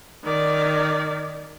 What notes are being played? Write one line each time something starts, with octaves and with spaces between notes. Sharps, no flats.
D#3 D5